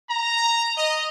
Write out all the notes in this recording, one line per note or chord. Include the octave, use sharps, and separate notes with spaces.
A#5
D#5